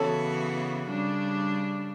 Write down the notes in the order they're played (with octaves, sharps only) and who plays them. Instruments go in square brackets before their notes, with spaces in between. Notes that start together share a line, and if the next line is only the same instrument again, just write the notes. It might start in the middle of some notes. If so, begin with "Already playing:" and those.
Already playing: [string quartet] C#3 E3 B3 F#4 [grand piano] A4 C#5
[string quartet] C#3 G3 D4